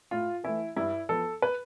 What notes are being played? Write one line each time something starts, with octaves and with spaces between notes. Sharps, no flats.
A2 F4
E3 A3 E4
G2 E4
F3 B3 A4
B4